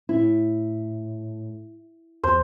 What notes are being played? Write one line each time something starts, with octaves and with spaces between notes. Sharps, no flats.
A2 E4
E2 C5